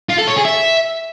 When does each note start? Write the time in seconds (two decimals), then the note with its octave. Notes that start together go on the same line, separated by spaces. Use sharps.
0.09 F4
0.18 A4
0.27 C#5
0.36 G#4
0.45 E5